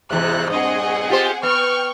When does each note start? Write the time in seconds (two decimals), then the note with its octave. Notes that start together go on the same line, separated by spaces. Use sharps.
0.11 E2 G#2 C3 F#6
0.50 G2 A#2 C4 G#4 D#5 F#5
1.10 F4 G4 C5
1.43 B3 G5 C#6 F6